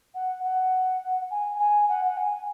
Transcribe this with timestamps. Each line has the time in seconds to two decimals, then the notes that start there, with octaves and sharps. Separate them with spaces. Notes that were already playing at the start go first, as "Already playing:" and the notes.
0.14 F#5
0.43 F#5
1.30 G#5
1.59 G#5
1.88 F#5
2.04 F#5
2.17 G#5